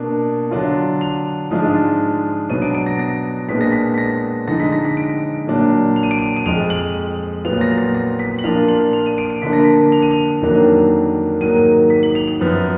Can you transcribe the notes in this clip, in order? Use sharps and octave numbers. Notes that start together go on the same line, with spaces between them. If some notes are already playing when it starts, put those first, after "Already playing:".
Already playing: B2 A#3 D4
D3 F#3 D4 F4
F7
G#2 F3 G#3 D4 F4
B2 F#3 B3 D4 D#7
D7
D7
A#6
A#6
A#2 G#3 B3 D4 B6
A#6
B6
B6
A#6
D3 F3 G#3 D#4 A#6
B6
A#6
B6
D7
A#2 F#3 D4
F7
D#7
D7
D#7
D#7
F2 F3 G#3 F7
F#7
A#2 F#3 B3 F4 F7
A#6
A#6
A#6
B6
F#7
A#2 F3 A#3 D4 F4 F7
F#7
F7
D#7
D7
D7
D3 F3 A#3 D4 B6
A#6
B6
F7
D#7
F7
F2 D#3 F#3 A#3 D4
G#2 D#3 F#3 A#3 D#7
B6
F#7
F7
F7
F#2 F3 B3